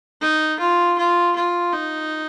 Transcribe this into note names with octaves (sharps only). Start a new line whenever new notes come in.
D#4
F4
F4
F4
D#4